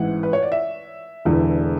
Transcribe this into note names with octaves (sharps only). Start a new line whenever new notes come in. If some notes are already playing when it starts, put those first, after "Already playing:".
Already playing: A1 G#2 E3 F#5
B4
C#5
D5
E5
E1 E2 D3